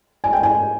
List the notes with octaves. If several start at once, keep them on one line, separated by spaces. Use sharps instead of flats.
G#5
G5
G#5